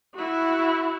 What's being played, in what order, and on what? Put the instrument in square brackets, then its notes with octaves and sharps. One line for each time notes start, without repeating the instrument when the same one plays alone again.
[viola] E4 F#4